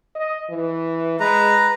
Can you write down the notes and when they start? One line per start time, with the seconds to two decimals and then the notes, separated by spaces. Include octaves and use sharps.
0.16 D#5
0.50 E3
1.20 G#3 B4 A#5